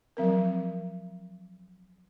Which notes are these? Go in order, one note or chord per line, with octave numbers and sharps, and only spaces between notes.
F3 F#3 C4 A#4